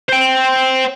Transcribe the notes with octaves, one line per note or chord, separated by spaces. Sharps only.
C5 G5